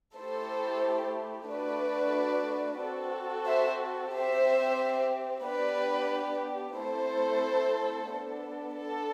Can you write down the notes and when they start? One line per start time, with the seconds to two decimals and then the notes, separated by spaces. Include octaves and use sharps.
0.15 A3 E4 G4 A4 C5
1.48 A3 D4 F#4 B4 D5
2.80 C4 F#4 A4
3.47 C5 E5
4.13 C4 G4 C5 E5
5.45 B3 D4 G4 B4 D5
6.77 A3 C4 E4 A4 C5
8.10 B3 D4 A4
8.77 A4